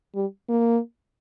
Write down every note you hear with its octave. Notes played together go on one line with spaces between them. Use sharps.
G3
A#3